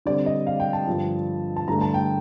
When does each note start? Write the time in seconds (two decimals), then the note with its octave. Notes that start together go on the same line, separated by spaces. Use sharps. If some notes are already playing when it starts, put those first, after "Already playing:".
0.06 D3 G3 C4 D5
0.26 D#5
0.47 F5
0.60 G5
0.73 A5
0.87 G2 D3 F3
1.57 A5
1.68 G2 D3 A3 A#5
1.81 A5
1.94 G5